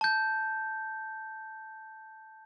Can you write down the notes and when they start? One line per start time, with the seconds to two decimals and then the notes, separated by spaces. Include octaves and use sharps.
0.01 A5 G6